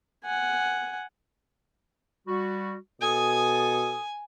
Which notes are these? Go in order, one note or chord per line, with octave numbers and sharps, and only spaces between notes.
F#5 G#5
G3 F#4
B2 A4 G#5 D#6